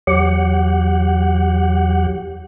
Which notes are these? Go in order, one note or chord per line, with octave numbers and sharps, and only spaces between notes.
E2 F#3 G4 F#5